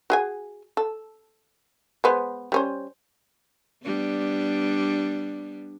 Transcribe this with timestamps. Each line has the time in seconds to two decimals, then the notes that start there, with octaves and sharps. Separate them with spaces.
0.10 F#4 G#4 G#5
0.77 A4
2.04 G#3 B3 C5
2.52 G3 C#4 C5
3.84 G3 B3 D4